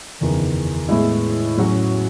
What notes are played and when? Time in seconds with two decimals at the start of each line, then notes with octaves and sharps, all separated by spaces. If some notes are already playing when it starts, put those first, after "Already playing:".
0.21 F#1 E2 D#3
0.89 A2 G#3 B3 E4
1.57 A2 F#3 C#4 F#4